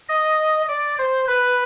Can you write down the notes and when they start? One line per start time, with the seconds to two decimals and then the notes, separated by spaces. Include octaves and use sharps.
0.09 D#5
0.68 D5
0.98 C5
1.28 B4